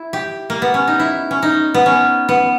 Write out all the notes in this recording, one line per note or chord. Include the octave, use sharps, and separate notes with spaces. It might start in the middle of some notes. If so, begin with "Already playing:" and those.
Already playing: E4
G4
A#3
B3
C#4
D#4
E4
C#4
D#4
B3
C#4
B3